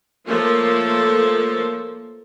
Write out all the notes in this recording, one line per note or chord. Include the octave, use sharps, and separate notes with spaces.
F3 A3 A#3 A4 C5 C#5